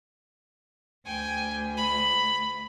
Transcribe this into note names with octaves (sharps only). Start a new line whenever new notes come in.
D2 G5 G#5
B5